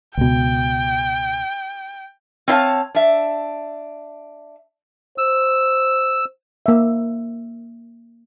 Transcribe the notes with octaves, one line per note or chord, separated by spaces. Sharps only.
C#2 B2 G5
C4 D4 C#5 E5 F5 A5
D4 E5
C5 E6
A#3 E5